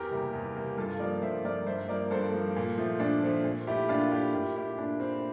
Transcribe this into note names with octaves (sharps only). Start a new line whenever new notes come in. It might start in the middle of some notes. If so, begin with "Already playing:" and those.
Already playing: E2 G4 A#4
C3 G3 A#3
E2
C3 G3 A#3
G2 F4 A4
F3 A#3 A#4 D5
G2 C5 E5
F3 A#3 A#4 D5
G2 C5 E5
F3 A#3 A#4 D5
G2 A4 C5
F3 A#3
A#2
F3 A3
A#2 D4
F3 A3 C4
A#2
A3 E4 G4
A#2 D4 F4
A3 E4 G4
A#2 E4 G4
A3 E4 G4
A#2 D4
A3 C4 E4